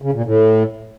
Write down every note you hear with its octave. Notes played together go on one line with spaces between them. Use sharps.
C#3
A#2
A2